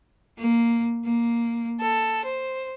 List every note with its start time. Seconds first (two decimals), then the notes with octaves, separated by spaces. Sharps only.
0.37 A#3
1.05 A#3
1.81 A4
2.25 C5